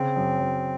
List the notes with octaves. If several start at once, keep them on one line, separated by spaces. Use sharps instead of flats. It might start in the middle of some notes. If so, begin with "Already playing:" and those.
Already playing: C#3 C4
F#2
F#2